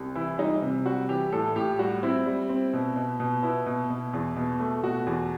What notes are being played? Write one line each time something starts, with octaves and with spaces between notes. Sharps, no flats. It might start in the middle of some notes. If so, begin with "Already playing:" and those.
Already playing: C2
E3 E4
G3 D#4
C3
G3 F#4
E3 G4
A2 A4
A2 G4
G3 F#4
C4 E4
G3
C4
B2
B2
B2
B3 E4
B2
B2
E2
B2
A3
B2 F#4
E2